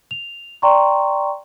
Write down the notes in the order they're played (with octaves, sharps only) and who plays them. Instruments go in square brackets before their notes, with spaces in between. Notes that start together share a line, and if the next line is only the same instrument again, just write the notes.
[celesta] F7
D5 G5 A#5 C6 C#6